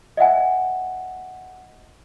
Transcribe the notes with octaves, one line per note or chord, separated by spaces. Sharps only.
D#5 E5 F#5 G#5